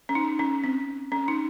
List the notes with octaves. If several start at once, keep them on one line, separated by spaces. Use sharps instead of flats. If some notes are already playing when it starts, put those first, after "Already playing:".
C#4
D#4
C#4
C4
C#4
D#4